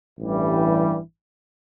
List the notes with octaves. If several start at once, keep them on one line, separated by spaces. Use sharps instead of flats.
A1 G2 E3 G3